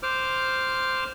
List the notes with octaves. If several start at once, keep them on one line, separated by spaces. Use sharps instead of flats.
C5 D6 F6